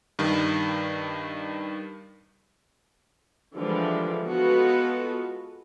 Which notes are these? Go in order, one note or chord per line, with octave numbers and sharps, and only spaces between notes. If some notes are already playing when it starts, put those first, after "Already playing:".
G2 D#3
D3 E3 F3 G3 G#3 D4
G#3 B3 F4 F#4 A4 B4